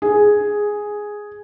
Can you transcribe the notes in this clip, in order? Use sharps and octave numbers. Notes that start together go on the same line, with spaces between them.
G#4